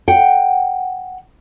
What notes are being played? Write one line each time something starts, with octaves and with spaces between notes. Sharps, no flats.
F#5 G5